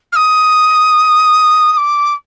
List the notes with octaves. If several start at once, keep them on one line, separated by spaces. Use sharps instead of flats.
F6
D#6
D#6
D6